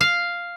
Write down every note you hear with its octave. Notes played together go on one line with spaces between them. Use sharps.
F5